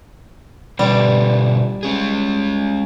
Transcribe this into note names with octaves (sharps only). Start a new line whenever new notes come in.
B2 D3 G3 F4
G#3 C#4 G#4